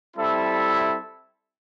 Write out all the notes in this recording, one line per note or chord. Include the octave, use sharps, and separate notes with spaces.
G3 C4 E4 A4 E5